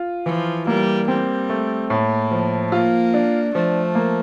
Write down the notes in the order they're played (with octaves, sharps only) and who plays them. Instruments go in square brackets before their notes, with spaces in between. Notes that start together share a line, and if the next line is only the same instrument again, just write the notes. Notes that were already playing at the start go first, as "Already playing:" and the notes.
Already playing: [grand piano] F4
[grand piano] E3 [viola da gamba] F3
[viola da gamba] G3 [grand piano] A#3
[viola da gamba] G3 [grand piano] C4
[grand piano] A3
[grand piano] A2 [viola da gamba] A#3
[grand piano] F3
[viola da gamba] A#3 [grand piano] F4
[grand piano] D4
[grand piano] F3 [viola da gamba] A3
[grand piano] A#3